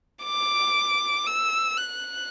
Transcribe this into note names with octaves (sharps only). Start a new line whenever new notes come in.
D6
E6
F#6